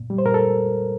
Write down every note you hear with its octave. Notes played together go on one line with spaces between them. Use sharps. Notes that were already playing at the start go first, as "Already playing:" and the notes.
Already playing: A#2
G3
C5
A#2 A#4
A4